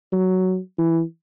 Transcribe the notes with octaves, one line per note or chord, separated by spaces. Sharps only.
F#3
E3